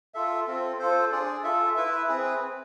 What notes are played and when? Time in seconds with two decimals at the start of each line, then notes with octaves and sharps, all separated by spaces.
0.14 F4 A4 E5
0.47 C4 F4 A4
0.79 F4 A4 C5
1.12 D4 G#4 D5
1.44 F4 A4 E5
1.76 E4 B4 E5
2.08 C4 G#4 B4